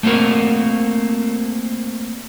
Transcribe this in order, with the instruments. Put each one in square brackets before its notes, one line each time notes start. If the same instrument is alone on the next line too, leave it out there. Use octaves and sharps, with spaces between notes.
[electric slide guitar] A3 A#3 C4 F#4 A#4